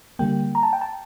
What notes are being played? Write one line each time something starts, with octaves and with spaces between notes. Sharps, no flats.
D3 G3 A#3 G5
A#5
A5
G5
A5